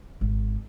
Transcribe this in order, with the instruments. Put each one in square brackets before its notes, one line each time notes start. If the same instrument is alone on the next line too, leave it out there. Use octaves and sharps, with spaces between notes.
[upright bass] G#1